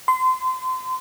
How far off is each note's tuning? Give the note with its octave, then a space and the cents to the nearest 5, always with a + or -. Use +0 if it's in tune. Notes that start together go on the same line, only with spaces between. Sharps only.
C6 -30